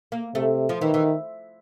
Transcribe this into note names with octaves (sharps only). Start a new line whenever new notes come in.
A#3
C3 A3
F3
D#3 E3
E3